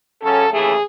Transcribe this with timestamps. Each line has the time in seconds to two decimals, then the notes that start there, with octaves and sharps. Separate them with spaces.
0.21 F#2 C#3 F#3 C#4 A4
0.51 D#2 C#3 E3 A3 G#4